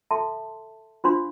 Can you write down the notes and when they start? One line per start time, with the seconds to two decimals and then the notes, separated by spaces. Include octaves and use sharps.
0.11 A4 E5 A5 C6
1.04 D4 F4 C5 F5 C6